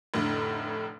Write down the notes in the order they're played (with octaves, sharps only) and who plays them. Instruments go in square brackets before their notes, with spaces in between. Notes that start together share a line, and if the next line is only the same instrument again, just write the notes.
[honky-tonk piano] F1 A2 D3